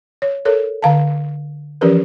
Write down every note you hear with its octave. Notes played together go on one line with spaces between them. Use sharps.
C#5
A4 A#4 C#5
D3 F5 A5
E3 F3 C#4 G4 A#4 B4